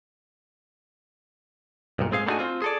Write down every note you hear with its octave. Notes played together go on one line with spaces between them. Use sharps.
B1 G2 A#2
G#2 C4 G#4 F5
A3 A#3 D4 D#4 F#4 G#5
C4 F4
G#4 A4 D5